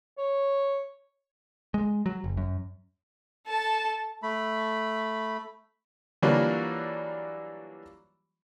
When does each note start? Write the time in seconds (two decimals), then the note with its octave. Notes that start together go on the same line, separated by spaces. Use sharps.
0.18 C#5
1.74 G#3
2.06 F#3
2.24 F#1
2.37 F#2
3.47 A4 A5
4.23 A3 B5
6.22 E3 F#3 G3 A#3 D4 F4